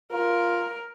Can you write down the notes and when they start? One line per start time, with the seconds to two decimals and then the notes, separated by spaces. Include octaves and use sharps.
0.12 F4 A#4